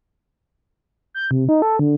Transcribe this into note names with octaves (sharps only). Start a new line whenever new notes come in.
G6
C3
D#4
A4
D3